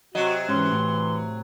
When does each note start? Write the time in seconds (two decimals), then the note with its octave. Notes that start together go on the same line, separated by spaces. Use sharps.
0.15 C3 F#3 F#4 D#5
0.49 G#2 E3 C#4 C6
0.72 A2